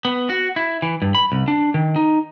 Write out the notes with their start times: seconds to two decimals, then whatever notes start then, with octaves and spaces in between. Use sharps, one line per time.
0.05 B3
0.29 F#4
0.56 E4
0.82 E3
1.02 G2
1.15 B5
1.32 C2
1.48 D4
1.74 D#3
1.96 D#4